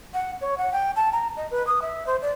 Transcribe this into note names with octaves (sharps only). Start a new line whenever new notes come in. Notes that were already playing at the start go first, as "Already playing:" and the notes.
F#5
C#5
F#5
G5
A5
A#5
D#5
B4
D#6
E5
C5
D5